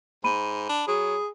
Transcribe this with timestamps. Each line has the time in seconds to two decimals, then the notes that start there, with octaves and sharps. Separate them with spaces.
0.24 G#2 B5 D#7
0.69 D4
0.88 F#3 G#4